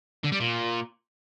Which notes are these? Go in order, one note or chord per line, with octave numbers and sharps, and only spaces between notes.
D3
G3
A#2